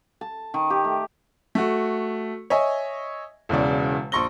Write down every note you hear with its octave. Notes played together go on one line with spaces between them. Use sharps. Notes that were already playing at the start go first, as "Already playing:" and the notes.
A5
D#3
G4
A3
A3 F#4
C#5 D#5 E5 G#5
E1 E2 C#3 D5
A#1 C6 C#6 A#6 G7